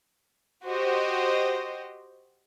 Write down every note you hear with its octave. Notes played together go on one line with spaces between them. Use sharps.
F#4 G4 C5 D#5